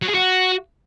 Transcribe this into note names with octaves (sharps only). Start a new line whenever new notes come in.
F#3
G#4
F#4